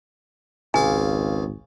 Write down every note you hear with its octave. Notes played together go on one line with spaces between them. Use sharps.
G#1 C#2 F5 G#5 D6